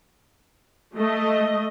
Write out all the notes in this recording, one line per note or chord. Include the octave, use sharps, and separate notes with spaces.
A3 D#5